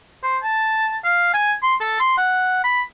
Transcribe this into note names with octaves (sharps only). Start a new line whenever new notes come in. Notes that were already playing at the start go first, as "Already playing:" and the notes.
C5
A5
F5
G#5
C6
A4
C6
F#5
B5